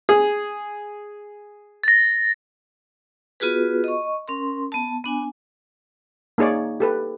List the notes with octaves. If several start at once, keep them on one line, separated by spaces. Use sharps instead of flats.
G#4
A6 A#6
B3 F4 F#4 G#4 B4
D#5 C#6
C#4 A#4 C6
B3 A5
B3 D4 G#5
A#3 D#4 G#4 C#5 D5
G4 A4 B4